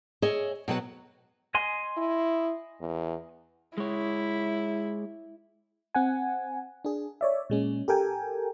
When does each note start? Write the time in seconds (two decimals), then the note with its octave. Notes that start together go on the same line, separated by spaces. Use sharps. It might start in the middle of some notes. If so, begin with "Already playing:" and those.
0.22 G#4 C#5 D#5 E5 G#5
0.68 B2 F#3 B3 F#5
1.55 D#5 G#5 C6
1.97 E4
2.81 E2
3.78 G#3 E4 C#5
5.95 C4 F#5 G#5
6.85 D4 G#4
7.21 C#5 D5 E5
7.50 A#2 G#3 C#4
7.88 G4 A4 A#4 G5 G#5